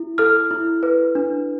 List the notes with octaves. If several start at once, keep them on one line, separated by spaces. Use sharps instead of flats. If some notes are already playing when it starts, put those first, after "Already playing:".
Already playing: E4
A4 F6
E4
B4
D4